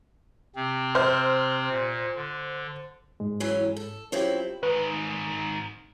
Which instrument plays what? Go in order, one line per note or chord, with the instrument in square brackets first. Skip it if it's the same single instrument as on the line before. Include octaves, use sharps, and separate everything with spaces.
[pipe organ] C3 C4
[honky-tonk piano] C5 F6
[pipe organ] A#2
D3
[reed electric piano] G#2 G#3
[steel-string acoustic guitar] E3 F#3 C#4
A4
[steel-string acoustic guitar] F#3 C4 E4 [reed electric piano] C#4 F4 G4
[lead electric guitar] G#2 D#3 [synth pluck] B4